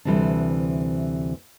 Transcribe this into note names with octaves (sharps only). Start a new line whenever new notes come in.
D2 C3 E3 G3 C4 D4